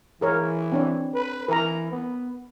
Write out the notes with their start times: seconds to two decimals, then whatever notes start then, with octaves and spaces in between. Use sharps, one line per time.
0.21 E3 G#4 A#4 C#5
0.72 C4 D4 C#5
1.14 B4
1.48 E3 A#4 A#5
1.92 B3